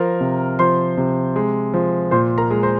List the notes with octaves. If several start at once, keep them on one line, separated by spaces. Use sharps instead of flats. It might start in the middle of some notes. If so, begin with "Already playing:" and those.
Already playing: F3 A#4 A#5
C3
F3 C5 C6
C3
G#3
F3
A#2 C5 C6
A#4 A#5
G#3
C5 C6